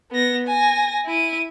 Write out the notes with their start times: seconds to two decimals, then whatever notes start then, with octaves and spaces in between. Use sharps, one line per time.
0.11 B3 A#6
0.47 G#5 A#6
1.06 E4 D#7